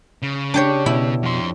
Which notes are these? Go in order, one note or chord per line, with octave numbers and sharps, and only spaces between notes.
C#3
D4 G4 C#5
B2 E4
F2 C6